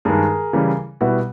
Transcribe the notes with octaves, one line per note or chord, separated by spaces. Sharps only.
G2 D#3 G#3 G#4 A#4
C#3 E3 G3
B2 G3 B3 E4 F#4